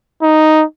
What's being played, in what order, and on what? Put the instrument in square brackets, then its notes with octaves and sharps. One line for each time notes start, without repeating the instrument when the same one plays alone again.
[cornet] D#4